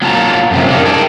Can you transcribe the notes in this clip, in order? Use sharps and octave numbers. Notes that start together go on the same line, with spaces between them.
F#3 A#3 F4 F#4 A5 A#5
F#2 C3 F3
D4 D#4 A#4
G4 G#4 G5 A5